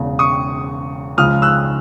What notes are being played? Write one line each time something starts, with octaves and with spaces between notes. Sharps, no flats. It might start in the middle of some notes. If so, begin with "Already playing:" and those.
Already playing: E1 E2 C#3
C#6 D#6
C#2 C#3 F3 G#3 D#6 F6
E6 F#6